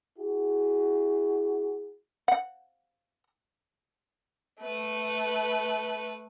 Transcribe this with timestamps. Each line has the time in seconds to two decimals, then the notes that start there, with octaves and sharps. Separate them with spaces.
0.18 E4 F#4 G#4
2.28 F#5
4.61 A3 B4